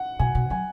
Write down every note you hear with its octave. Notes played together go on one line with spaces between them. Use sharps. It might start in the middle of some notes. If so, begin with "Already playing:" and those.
Already playing: F#5
B2 G#5
B2
F#3 G#5